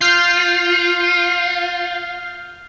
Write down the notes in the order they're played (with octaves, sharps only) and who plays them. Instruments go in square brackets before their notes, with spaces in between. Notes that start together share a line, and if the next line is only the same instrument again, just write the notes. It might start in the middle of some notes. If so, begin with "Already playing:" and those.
[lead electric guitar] F4 [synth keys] F6 G6 C7